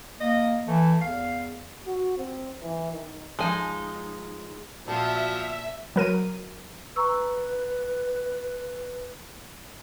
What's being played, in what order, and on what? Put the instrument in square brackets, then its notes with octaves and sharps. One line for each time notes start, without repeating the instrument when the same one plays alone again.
[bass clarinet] A#3 [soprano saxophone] D#5
[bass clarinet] E3 [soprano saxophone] A3
[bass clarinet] E2 [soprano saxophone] F5
[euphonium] F#4
C4
E3
D#3
[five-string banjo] F3 G#5 [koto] G#3 D#4
[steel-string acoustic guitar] A#2 A5 [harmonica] F3 [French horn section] F#4 [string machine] E5
[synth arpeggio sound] F#3 A#4 D#7
[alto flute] B4 [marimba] A#5 C#6 E6